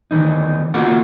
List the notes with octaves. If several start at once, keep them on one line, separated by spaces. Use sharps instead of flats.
D2 D#3 E3 D#4
A#3 F4 F#4 A4 F#5